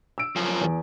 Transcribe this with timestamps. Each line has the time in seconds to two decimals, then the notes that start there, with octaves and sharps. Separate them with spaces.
0.18 E6 D7
0.36 F#2 F3
0.61 E2